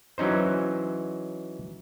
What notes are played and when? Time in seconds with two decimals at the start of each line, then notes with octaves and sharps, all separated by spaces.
0.18 E3 F#3 C#4 D#4 C5